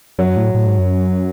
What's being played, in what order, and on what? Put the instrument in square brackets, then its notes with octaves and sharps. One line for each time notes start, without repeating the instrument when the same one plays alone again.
[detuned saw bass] F#2 [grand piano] F#3
[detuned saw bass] A2
A2
G#2
F#2